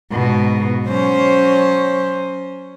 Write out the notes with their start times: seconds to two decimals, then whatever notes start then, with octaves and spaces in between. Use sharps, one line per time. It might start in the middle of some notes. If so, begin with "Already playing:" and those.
0.11 G#2 B2
0.87 F#3 C#4 C5